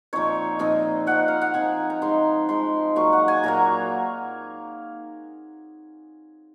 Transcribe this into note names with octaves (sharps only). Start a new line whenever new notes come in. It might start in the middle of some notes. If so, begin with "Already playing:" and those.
A#2 F3 C4 D#4 C#5
A#2 F3 C4 D#4 D#5
F3 C4 D#4 F#5
F5
F#5
F3 C4 D#4 G#5
A#5
F3 G#3 D#4 C6
F3 G#3 D#4 C6
A#2 F#3 A#3 C#6
F#5
G#5
A#2 F#3 A#3 A#5